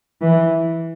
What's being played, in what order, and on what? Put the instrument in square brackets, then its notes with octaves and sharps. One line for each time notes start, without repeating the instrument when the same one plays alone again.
[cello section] E3